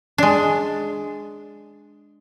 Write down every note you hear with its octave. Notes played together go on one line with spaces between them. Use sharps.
G#3 D4